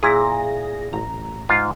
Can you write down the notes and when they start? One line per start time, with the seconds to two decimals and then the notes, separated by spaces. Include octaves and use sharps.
0.03 A#2 E4 G#4 A#6
0.93 A1 A#5
1.49 G#2 F4